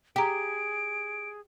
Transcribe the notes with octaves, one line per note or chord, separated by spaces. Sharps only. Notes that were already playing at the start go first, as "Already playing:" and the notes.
G4 G#4 G5 A#5 D7